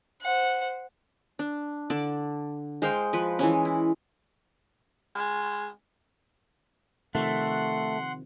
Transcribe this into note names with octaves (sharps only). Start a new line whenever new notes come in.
C5 F#5
D4
D3 D5 A5 D6
G#3 C5 F5 G5
F3 B4
E3 G#3 C#4
E4
G#3
C3 D#3 F3 A3 F#5 C6 F#6